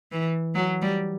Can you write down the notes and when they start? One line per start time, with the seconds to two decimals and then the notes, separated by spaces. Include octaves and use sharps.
0.12 E3
0.55 F#3
0.82 G3